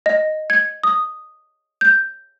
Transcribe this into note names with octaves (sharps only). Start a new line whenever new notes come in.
D#5
G#6
D#6
G6